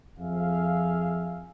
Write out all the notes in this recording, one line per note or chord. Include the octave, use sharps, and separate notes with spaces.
F2 F3 F4 G#4 E5 F5